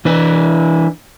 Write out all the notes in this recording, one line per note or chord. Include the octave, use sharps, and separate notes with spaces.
E3 D4 B4